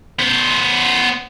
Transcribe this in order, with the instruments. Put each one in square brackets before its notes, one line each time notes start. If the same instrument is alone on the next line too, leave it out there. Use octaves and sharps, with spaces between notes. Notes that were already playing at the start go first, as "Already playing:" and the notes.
[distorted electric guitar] B3 C5